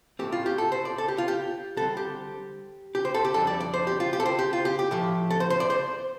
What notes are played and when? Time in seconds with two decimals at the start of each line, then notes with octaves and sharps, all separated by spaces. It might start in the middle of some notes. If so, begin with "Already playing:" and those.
0.19 A2 A3 C4 G4
0.32 F4
0.46 G4
0.58 A4
0.72 C5
0.85 D5
0.98 A4
1.08 G4
1.18 F4
1.28 G4
1.76 D3 G3 C4 A4
1.97 G4
2.95 G4
3.05 C5
3.14 A4
3.25 G4
3.34 F2 D3 G3 D4 A4
3.47 D5
3.60 D5
3.74 C5
3.87 G4
4.00 F4
4.13 G4
4.20 A4
4.26 C5
4.39 G4
4.53 F4
4.65 G4
4.79 G4
4.91 A2 F3 A3 G4
5.30 A4
5.40 C5
5.50 C5
5.60 D5
5.70 C5